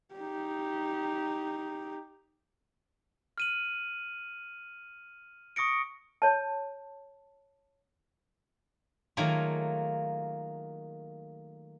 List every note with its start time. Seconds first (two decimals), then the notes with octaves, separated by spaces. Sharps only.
0.14 D#4 G4
3.38 F6 D#7 F#7
5.56 C#6 D#6 A#6 C#7 D7
6.22 C#5 A5
9.17 D#3 F#3 A3 A#3 F4 G#4